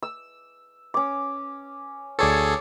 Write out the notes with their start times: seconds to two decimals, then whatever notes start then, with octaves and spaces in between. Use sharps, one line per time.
0.03 E6
0.94 C#4 D6
2.19 D2 G#4 A4 C#5 D5